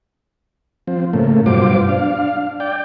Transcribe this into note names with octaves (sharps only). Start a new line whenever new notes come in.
F3 C4
A2 C#3 A3 A#3
G2 B2 F#3 F4 C5 D6
D4 F5
D5 G5